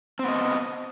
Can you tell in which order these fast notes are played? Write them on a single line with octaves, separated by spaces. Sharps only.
C4 B3 D#5